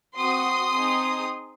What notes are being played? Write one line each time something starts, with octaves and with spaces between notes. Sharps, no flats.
C4 F#4 C6 D#6
C4 D#4 G#4